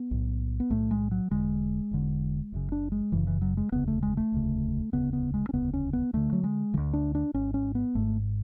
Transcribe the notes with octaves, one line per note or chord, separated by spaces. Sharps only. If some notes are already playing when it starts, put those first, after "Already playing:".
Already playing: B3
B1 A2
B3
B1 A2 A3
G#3
F#3
E1 E2 D3 G#3
E1 E2 D3
F#1 F#2 C#3
D4
G#3
F#1 F#2 C#3 E3
E3
F#3
G#3
E1 D2 C#3 B3
A3
G#3
A3
E1 D2 C#3
E1 D2 C#3 B3
B3
G#3
C#4
E1 D2 C#3 B3
C#4
B3
D2 D3 A3
F#3
G#3
D2 D3 E3
D4
D4
G#1 G#2 C#4
C#4
B3
G#1 G#2 A3